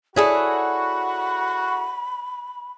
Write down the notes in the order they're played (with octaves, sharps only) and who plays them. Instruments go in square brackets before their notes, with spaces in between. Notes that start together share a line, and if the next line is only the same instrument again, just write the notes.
[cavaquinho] E4 G#4 A4 [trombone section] F#4 [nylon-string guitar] C#5 D5 [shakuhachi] B5